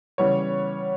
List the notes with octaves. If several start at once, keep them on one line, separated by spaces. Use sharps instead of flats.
C#3 E3 G3 B3 C#5